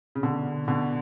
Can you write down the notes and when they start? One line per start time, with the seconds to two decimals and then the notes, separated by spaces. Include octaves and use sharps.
0.15 C#3
0.23 B2 D3
0.68 B2 D3